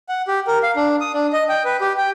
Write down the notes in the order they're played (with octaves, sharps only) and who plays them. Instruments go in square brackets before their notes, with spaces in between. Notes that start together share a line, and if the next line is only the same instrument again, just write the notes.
[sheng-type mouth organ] F#5
G4
A#4
F5
D4
D#6
D4
D#5
G5
B4
G4
G5